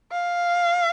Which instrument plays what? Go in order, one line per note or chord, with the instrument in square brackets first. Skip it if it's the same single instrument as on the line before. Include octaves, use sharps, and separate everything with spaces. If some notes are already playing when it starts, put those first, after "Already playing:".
[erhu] F5